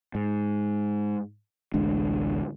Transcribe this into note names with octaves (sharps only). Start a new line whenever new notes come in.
G#2
A1 D2 G#3 D4